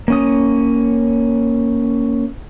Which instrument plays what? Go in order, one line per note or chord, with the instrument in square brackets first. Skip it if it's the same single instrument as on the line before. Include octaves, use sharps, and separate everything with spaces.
[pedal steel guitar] A#3 C#4 D#6